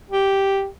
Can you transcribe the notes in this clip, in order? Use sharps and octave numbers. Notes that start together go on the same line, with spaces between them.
G4